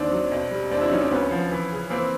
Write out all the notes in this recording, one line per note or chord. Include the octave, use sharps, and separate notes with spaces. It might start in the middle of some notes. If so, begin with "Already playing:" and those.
Already playing: D#2 D#3 C4 D4
F#3
B1
G3
D#2 C4 D4
D4 E4
F#3 C#4 D#4
C4 D4
D2 B3 C#4
F3
E3
C#3
E3 A#3 C4